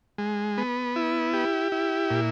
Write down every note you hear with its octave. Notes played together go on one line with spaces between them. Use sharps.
G#3
B3
E4
G4
E4
A#2